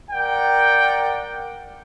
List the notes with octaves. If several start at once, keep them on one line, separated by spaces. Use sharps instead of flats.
A#4 D5 F#5 G5